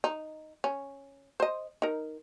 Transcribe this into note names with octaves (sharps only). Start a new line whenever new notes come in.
D#4
C#4
C5 D#5
D#4 A#4